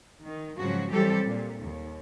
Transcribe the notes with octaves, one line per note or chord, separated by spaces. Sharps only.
D#3
G#2 C#3 F3 F#3 F#4
E3 F#3 G3 C4 G4 A4
A#2
D#2